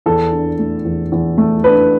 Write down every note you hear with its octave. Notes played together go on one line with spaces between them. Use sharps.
E2 A4
D4
A3
E2
E2
A3
D4 B4